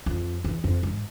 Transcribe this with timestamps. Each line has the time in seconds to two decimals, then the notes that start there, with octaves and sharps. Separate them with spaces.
0.06 F2
0.44 E2
0.64 F2
0.83 G#2